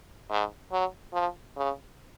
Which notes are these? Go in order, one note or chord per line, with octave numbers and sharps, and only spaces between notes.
G#2
F#3
F3
C#3